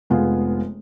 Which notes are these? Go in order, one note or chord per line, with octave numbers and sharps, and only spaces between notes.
F1 G#3 B3 F4 G#4